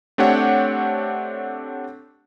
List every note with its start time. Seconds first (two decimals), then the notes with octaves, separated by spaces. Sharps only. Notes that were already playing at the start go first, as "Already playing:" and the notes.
0.18 A3 C4 D4 G4 C#5 F#5